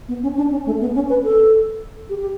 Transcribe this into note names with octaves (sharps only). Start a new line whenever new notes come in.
B3
C#4
D4
C#4
A3
B3
C#4
B4
A4
G4
G4